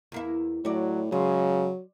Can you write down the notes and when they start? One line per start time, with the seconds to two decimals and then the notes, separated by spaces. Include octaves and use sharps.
0.12 E2 A#3 E4
0.65 A2 F#3 F#4 D5
1.12 C#3 F#3 G#3